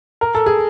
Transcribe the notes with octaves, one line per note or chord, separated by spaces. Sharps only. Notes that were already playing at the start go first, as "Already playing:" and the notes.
A#4
A4
G#4